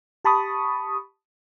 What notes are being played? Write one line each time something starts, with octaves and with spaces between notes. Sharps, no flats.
G4 A5 B5 C#6 D#6